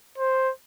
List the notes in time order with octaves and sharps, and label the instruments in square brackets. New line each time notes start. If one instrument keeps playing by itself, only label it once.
[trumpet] C5